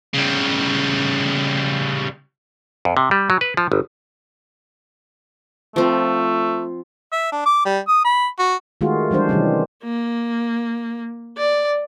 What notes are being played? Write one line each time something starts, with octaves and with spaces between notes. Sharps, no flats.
C#3 G3
F2
C3
G3
F#3
B4
F3
G1
F3 A3 C4
E5
D4
D6
G3
D#6
B5
F#4
D#3 G#3 A3 F4 F#4 G#4
E3 G3 G#3 D4 C5
C3 D#3 E3 G3 C#4
A#3
D5